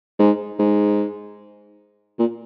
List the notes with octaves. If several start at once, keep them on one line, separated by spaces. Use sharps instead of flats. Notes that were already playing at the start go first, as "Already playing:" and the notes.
G#2
G#2
A#2